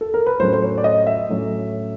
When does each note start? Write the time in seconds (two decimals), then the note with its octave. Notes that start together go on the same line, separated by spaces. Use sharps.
0.01 A4
0.14 A#4
0.26 B4
0.40 A2 F#3 A3 C#4 C5
0.53 C5
0.62 C#5
0.78 D5
0.84 D#5
1.07 E5
1.29 A2 F#3 A3 C#4